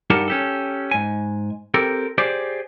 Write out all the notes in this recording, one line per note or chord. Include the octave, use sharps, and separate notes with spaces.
G2 D#4 G4 A#4 F#5 A5
C#4 G4 A4
G#2 G#5
C4 G4 A4 A#4
G4 G#4 C5 D5